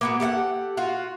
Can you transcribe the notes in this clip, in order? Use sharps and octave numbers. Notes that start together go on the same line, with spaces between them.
A#3 B3 F#4
G4 A4 E5 F#5
F4 F#4